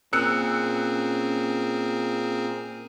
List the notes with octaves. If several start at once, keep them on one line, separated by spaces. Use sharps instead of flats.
A#2 C4 C#4 G#4 A#4 E6 F#6 C#7